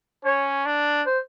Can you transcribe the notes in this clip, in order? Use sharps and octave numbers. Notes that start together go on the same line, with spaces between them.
C#4 C#5
D4
C5